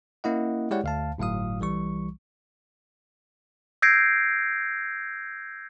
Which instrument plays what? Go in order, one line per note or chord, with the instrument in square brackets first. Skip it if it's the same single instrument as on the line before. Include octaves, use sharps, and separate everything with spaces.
[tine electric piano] A#3 C#4 E4 D#5 F#5
G#3 E4 G4 C#5 D5 F#5
D2 F5 A5
G1 A2 F#3 F5 D#6
B1 E3 G3 C#6
[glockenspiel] E6 G6 G#6 A#6 C7 D7